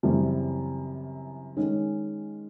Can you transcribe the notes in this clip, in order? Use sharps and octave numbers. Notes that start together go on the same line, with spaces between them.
F#2 C#3 E3 G3 C4
D#3 G#3 C#4